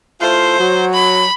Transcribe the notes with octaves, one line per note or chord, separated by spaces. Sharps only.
A3 E4 F4 C5
F#3
B5